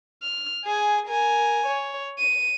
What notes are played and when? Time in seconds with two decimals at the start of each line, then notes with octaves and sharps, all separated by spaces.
0.22 F6
0.65 G#4 G#5
1.07 A#4 G#5
1.67 C#5
2.19 D#7